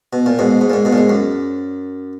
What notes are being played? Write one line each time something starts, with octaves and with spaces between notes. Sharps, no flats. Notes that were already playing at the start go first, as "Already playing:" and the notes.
B2
A#2
G#2 B2
G#2
A#2
G#2
G#2 B2
A#2
G#2
F#2